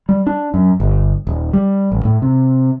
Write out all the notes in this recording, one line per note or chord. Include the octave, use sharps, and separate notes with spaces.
G3
D4
F#2
G1
D#1
G3
A1
A2
C3